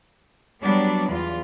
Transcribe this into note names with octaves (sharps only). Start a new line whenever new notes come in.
F#3 G3 B3 D4
E2 F4